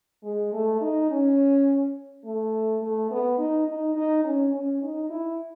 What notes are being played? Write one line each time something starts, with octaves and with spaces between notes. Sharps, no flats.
G#3
A3
D#4
C#4
A3
A3
B3
D#4
D#4
D#4
C#4
C#4
D#4
E4